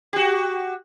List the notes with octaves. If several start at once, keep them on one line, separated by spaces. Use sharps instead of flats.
F#4 G4